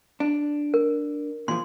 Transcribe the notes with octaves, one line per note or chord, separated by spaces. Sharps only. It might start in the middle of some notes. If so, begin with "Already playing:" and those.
D4
A#4
A#2 E3 F3 C6